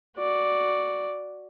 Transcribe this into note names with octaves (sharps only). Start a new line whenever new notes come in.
F#4 D5